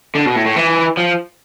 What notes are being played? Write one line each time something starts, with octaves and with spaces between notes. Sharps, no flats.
D3
B2
A2
A2
E3
F3